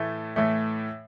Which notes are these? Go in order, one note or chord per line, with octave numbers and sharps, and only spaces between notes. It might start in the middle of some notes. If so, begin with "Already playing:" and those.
Already playing: A2 E3 A3
A2 E3 A3